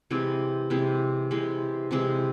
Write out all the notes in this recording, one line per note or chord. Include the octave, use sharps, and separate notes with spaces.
C3 E3 G#3 C4 D5
C3 E3 G#3 C4
C3 E3 G#3 C4
C3 E3 G#3 C4